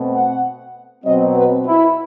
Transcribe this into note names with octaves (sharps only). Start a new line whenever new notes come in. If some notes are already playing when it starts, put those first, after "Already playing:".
Already playing: B2 A3 C4
F#5
B2 F#3 C4 D#5
B4
E4